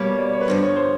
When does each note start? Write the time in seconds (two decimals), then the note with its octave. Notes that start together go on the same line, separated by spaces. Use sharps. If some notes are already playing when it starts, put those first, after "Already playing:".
Already playing: B2 G3 A#3 C#5
0.19 D5
0.33 C#5
0.41 B4
0.48 G2 D3 F3 C5
0.63 C#5
0.76 C5